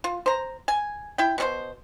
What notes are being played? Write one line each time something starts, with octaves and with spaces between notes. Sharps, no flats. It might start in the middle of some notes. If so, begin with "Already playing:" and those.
F4
C5 A#5
G#5
E4 G5
B2 C#4 C5